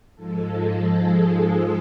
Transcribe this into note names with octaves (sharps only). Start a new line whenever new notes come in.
G#2 F3 G#3 A4
A4
G#4
A4